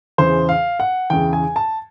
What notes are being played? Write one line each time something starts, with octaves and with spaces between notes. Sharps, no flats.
E2 C#3 E3 C5
F5
F#5
E2 C#3 E3 G5
G#5
A5